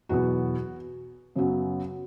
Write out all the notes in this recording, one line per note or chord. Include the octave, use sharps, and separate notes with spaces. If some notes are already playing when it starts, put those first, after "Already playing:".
E2 B2 F#3 B3 F#4
F#2 C#3 F#3 B3